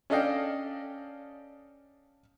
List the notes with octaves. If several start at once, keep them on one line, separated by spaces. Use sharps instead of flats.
C#4 D4 A4 D#5 F5 G5